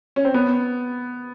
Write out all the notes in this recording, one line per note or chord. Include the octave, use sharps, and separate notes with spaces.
C#4
C4
B3